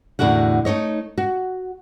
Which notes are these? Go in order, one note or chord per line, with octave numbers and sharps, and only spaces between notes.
E2 A2 D3 F#4 F#5
A3 D#4 C#5 D#5
F#4